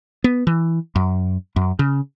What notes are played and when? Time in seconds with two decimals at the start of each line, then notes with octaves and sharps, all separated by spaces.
0.24 B3
0.47 E3
0.96 F#2
1.56 F#2
1.79 C#3